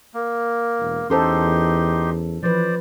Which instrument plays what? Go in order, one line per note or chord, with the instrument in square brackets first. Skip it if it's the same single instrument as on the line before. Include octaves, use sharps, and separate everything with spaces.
[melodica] A#3
[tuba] E1
[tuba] E2 [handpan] C#4 A4 C5 [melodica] D#4 G4 C6
[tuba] E3 [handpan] F3 B4 [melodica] C5 D5